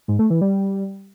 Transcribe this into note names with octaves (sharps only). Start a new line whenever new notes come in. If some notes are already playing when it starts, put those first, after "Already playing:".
G#2
A3
E3
G3